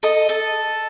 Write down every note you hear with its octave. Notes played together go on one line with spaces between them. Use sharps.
A4 D#5
A4